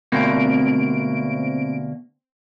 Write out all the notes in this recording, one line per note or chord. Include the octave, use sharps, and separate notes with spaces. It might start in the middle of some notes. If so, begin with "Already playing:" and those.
D2 B2 A#3 C4 D7